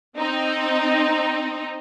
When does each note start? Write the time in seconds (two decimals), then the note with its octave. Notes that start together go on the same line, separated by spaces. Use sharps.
0.16 C4 D#4